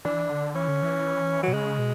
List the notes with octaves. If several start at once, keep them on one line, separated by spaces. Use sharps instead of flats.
E3 D4
D3
E3 C#4
D3
E3
F#3
B2
C#3 G#3
B2